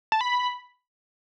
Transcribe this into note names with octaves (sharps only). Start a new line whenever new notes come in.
A5
B5